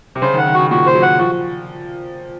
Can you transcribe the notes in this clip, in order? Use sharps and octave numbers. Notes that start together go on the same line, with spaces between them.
C3
C#3 C5
D#3
F#5
D#3
C#3 F#4
A#2 F#4
C5
F#3
F#5
F3 F#4